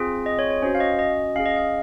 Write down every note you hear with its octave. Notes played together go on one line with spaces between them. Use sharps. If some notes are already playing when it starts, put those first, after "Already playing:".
Already playing: C4 F4 G#4
D#5
C#5
C#5
C#4 F#4 C5
F5
D#5
D#5
C#4 G#4 F5
D#5
F5